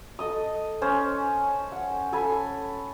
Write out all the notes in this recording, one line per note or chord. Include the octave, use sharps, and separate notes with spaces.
A4 D#5 D#6
C#4 C5
F#5
A4 G#5 B5